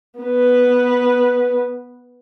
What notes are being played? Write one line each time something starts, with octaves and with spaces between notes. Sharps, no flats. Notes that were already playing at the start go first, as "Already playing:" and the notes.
B3 B4